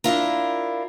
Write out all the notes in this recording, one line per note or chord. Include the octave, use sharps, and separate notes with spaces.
D4 E4 F4 A#4